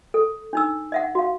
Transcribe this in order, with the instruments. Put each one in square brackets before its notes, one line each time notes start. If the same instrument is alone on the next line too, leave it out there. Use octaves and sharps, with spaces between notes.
[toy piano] A4
D4 D#4 E6
D#5 E5 F#5
F#4 F5